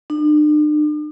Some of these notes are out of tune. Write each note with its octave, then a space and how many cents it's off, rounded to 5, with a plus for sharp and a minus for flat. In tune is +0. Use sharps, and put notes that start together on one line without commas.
D4 +45